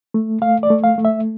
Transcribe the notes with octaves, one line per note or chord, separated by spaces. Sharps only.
A3
A3 F5
D5
A3
F5
A3
E5